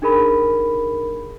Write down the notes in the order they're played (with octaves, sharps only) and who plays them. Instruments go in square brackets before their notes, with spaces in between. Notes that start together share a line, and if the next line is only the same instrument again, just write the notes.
[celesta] D4 D#4 G#4 A#4 B5